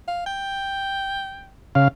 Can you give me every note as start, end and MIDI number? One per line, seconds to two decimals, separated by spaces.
0.08 0.21 77
0.26 1.52 79
1.75 1.88 49
1.75 1.88 77